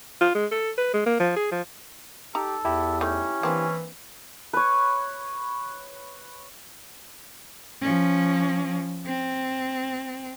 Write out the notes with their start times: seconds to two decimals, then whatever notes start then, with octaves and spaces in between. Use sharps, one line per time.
0.21 F4
0.35 G#3
0.52 A4
0.78 B4
0.94 G#3
1.06 A#3
1.20 F3
1.36 G#4
1.51 F3
2.35 D#4 G4 A4 A#5
2.65 E2 E4 G4
3.01 A3 C#4 D#4
3.43 E3 A#3 C4 D4
4.53 B4 C#5
7.81 F3 C#4
9.06 C4